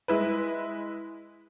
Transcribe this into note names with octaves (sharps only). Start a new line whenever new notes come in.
G#3 E4 B4